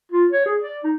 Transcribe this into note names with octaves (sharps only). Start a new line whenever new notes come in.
F4
C#5
G#4
D5
D#4